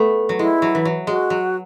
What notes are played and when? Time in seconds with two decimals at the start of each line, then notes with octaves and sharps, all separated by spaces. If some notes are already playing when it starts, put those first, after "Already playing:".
Already playing: A3 B3
0.29 F#3
0.39 G#3 E4
0.62 F#3
0.75 E3
0.85 F#3
1.07 G#3 F#4
1.30 F#3